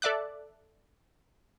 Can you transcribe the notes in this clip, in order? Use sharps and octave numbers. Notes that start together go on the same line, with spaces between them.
A4 D5 E5 D6 F#6